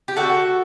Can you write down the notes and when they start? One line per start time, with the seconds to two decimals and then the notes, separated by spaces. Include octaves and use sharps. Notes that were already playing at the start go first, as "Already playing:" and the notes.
0.08 G4
0.16 D3 A3 F#4 A4